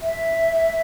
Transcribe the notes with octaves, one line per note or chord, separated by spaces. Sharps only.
E5